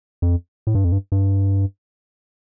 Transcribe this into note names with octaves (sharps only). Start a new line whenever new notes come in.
F2
A2
G2
F2
G2
G2